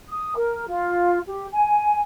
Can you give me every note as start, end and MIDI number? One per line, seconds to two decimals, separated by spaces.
0.09 0.32 87
0.35 0.65 70
0.67 1.19 65
1.27 1.46 67
1.53 1.99 80